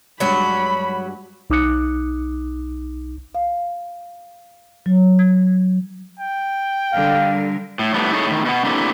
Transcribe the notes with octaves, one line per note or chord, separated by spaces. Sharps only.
G2 F#3 G#3 D4 F#4 B5
B1 D#4 D6 D#6 F#6 C#7
F5
F#3
G#6
G5
D3 G3 A#4 F5
A2
A2 G3 A3 B3
D#4 E4 G#4 A4 C#5
A2 D#3
B2 B3
A3 A#3 C4 D4 E4 G4